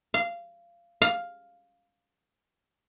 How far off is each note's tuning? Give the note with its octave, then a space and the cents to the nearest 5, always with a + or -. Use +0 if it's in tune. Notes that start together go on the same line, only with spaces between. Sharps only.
F5 -20
F5 +5